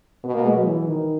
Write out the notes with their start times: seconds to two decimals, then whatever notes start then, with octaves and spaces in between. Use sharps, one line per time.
0.24 B2 B3
0.34 A#3
0.45 G#3
0.55 F#3
0.66 E3
0.87 D#3